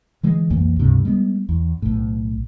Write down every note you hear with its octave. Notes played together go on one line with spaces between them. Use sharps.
D3 E3 G#3
B1 F2 E3 A#3
C#2 G2 C3
G3 G#3 B3
E2
B1 A2